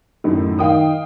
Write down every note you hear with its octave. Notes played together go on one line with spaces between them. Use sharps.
F#2 A2 D#3
D#3 F5 G5 D#6